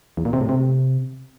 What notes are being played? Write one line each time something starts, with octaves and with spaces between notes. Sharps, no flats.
E2
A#2
C3
A2
C3